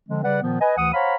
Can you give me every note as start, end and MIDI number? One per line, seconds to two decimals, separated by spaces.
0.09 0.22 50
0.09 0.22 53
0.09 0.22 56
0.09 0.22 60
0.24 0.41 49
0.24 0.41 55
0.24 0.41 71
0.24 0.41 74
0.24 0.41 78
0.42 0.57 46
0.42 0.57 51
0.42 0.57 53
0.42 0.57 59
0.61 0.74 71
0.61 0.74 75
0.61 0.74 80
0.77 0.93 38
0.77 0.93 52
0.77 0.93 78
0.77 0.93 87
0.94 1.16 72
0.94 1.16 73
0.94 1.16 77
0.94 1.16 78
0.94 1.16 82
0.94 1.16 83